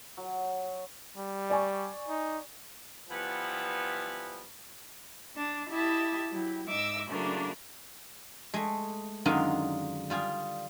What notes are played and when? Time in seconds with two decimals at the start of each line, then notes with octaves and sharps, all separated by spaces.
0.17 F#3
1.17 G3
1.50 D5 G#5 C#6
2.08 D#4
3.09 E3 F3 G3 B3
5.35 D4 A5
5.69 E4 G4 D#5 E5 A5
6.30 F#3 E4 G4
6.67 G#2 D#4 E5 D6 E6
7.08 C#3 F#3 A3 A#3 D4 E4
8.54 G#3 A3
9.25 F#2 D3 D#3 G#3 D#4 F4
10.10 G3 F4 G#4